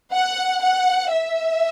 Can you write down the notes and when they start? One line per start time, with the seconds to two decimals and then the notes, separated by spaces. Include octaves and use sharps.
0.13 F#5
0.62 F#5
1.12 E5